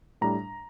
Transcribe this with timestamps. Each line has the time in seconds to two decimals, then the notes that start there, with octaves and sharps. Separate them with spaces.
0.21 A2 G3 D4 A#5